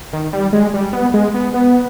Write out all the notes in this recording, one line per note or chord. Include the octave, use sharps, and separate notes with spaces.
D#3
G3
G#3
G3
B3
G#3
B3
B3